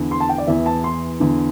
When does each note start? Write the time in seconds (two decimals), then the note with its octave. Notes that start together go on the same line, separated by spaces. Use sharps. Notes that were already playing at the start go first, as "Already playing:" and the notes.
Already playing: E2 D3
0.11 C6
0.20 A5
0.29 G5
0.38 D5
0.47 E2 E3 E5
0.66 A5
0.84 C6
1.20 E2 D3